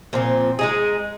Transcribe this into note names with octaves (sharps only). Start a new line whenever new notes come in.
A#2 F3 C4
G#3 D#4 G#4